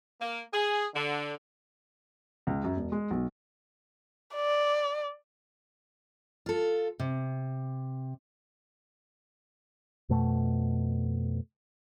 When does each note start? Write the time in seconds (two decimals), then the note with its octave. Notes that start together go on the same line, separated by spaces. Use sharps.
0.21 A#3
0.53 G#4
0.94 D3
2.47 C#2
2.64 F#2
2.77 E1
2.92 G#3
3.11 B1
4.35 D5
6.46 F4 A4
7.00 C3
10.09 F2 B2 A3